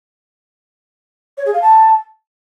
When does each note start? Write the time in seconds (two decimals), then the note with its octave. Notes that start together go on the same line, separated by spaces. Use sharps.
1.38 C#5
1.46 G#4
1.54 F5
1.62 A5